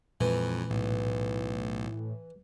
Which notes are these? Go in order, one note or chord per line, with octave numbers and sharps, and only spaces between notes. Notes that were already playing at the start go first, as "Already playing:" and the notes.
F2 A#2 E3 G#3 C4
B1 A2